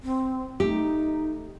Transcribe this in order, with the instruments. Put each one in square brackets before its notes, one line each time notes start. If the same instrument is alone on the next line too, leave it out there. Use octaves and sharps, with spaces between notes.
[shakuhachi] C4
[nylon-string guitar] A3 G4 [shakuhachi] D#4